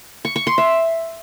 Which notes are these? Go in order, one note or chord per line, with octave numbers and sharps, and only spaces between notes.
C#6
C#6
C6
E5